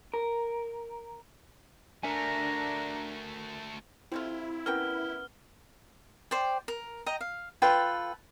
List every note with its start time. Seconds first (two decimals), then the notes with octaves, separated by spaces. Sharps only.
0.14 A#4
2.03 A3 D4 F#4 A#4 E5 G#5 A#5
4.12 C3 A3 C4 E4 F4
4.66 B3 C#4 A#4 G5 F6
6.31 C5 D5 G5
6.68 A#4
7.06 D#5 G5 A#5
7.21 F5
7.62 F4 A4 B4 G5